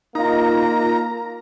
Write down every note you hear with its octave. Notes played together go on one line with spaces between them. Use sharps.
A#3 D#4 F4 A#5